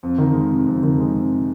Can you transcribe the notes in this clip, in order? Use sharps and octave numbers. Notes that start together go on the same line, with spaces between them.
F2
D#3
G#3
C3
F2
D#3
G#3
C3